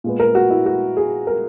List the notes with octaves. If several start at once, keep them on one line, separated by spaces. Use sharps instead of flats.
A#2 G#3 B3
A#4
F#4
E4
F#4
G#4
A#4